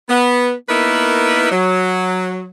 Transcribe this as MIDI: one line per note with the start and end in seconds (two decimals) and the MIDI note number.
0.09 0.53 59
0.69 1.51 58
0.69 1.51 59
0.69 1.51 63
0.69 1.51 64
0.69 1.51 70
0.69 1.51 71
1.51 2.48 54